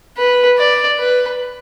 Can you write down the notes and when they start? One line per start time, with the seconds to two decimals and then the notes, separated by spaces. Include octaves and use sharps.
0.17 B4
0.58 D5
0.99 B4